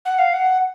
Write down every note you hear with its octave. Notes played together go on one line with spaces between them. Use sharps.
F#5
F5
F#5